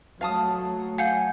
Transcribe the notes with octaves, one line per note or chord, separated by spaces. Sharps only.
F#3 A3 F5 A5 D#6
F5 F#5 G#5 G6